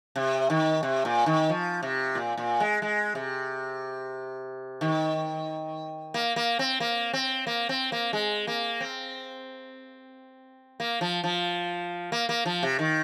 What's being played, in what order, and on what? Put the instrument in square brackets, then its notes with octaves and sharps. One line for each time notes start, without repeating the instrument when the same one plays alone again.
[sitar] C3
D#3
C3
A#2
D#3
F3
C3
A#2
A#2
G#3
G#3
C3
D#3
A#3
A#3
C4
A#3
C4
A#3
C4
A#3
G#3
A#3
C4
A#3
F3
F3
A#3
A#3
F3
C3
D#3